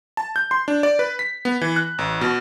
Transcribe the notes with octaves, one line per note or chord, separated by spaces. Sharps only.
A5
G6
C6
D4
D5
B4
B6
B3
E3
F#6
A1
B2